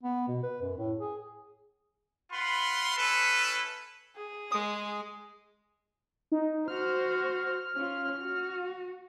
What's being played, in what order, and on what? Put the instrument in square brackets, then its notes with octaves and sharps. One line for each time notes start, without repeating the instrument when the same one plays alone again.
[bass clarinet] B3
B2
B4
F#2
A2
G#4
[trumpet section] F4 B4 F#5 B5 C6
C#4 E4 A4 B4
[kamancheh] G#4
[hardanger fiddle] G#3 [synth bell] D#6
[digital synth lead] D#4
[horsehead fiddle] F#4 C5 [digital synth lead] F6
[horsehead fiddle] C#4 F4
F#4